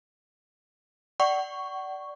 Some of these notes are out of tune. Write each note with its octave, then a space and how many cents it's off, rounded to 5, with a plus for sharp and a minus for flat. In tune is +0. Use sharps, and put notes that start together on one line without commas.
D5 +0 F#5 +35 C#6 +0